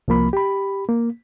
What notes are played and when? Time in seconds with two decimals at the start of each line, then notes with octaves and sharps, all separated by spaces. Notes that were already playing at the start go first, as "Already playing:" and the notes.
0.08 C2 F3 A#3 B5
0.33 G4 B5
0.89 A#3